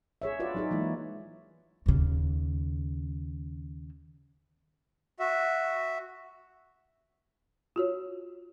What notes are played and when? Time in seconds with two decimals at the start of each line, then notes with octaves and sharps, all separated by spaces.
0.22 G#4 C#5 E5
0.40 F4 F#4 B4 D5
0.55 F#3 D#4 G#4
0.71 E3 G#3 A#3 D#4 E4
1.86 D#2 C#3
5.20 F#4 E5
7.76 F4 F#4 C#5